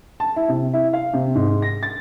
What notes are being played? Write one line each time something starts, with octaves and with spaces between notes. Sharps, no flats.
A5
E4
C3
E4
F5
C3
G#2
A#6
A6